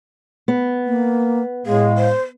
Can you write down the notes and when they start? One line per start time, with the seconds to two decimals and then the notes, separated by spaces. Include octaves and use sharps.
0.48 B3
0.86 A#3
1.66 A2 G#3 G#4 F5
1.98 C5